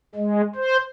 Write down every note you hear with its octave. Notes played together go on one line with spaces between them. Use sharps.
G#3
C5